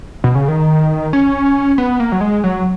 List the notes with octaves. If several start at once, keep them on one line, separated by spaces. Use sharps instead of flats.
B2
C#3
D#3
C#4
B3
A#3
F#3
G#3
F#3